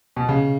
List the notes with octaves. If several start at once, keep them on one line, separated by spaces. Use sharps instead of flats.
B2
C#3